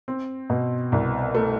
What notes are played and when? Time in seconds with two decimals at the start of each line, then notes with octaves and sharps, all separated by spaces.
0.08 C4
0.50 B2
0.92 C2
1.35 A3